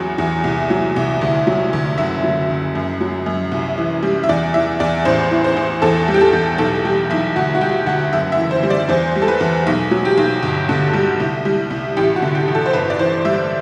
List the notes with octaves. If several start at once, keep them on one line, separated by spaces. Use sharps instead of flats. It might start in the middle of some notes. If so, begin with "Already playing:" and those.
Already playing: A1 E2 F#3
E2
C2
F#3
C2
D2
F#3
D2
F#1 E5
F#3
F#1
F#2
F#3
F#2
C2
E3
G3
E5
E2 D5
E3 E5
E2 D5
A1 C5
E3
C5
A1
E2 A4
G3
G4
A4
E2
B1 A4
G3 G4
B1 E4
D2 F#4
F#4
G3 G4
D2 F#5
F#1 E5
E5
E3
C5
G3
D5
E2 C5
G3
A4
B4
E2
B1
F#3
G4
B1
G1
D3
G3
C2
G3
C2
A1 G4
F#4
D3
G4
A1
A4
C5
G1 B4
D5
E3 C5
G3 E5